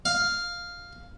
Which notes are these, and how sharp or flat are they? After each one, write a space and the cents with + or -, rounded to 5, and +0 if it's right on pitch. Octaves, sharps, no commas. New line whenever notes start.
F5 +0